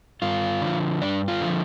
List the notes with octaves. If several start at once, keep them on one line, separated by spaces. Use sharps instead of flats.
G2 F4
D3 F3
G2 D4
F4
D3 F3